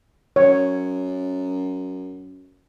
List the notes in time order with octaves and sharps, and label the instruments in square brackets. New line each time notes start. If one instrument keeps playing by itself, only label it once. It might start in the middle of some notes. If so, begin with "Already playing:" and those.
[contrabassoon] F#2 [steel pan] C#5